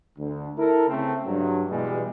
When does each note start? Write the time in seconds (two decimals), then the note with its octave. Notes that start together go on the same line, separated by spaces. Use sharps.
0.19 D2
0.57 E4 A4 A#4
0.89 C#3 A3 C4
1.26 G2 F#3
1.69 B2 E3 G3 G#3